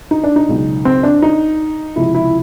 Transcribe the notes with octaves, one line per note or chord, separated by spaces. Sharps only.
D#4
D4
D#4
C#2 B2 F#3
C4
D4
D#4
C#2 C3 F3 E4
E4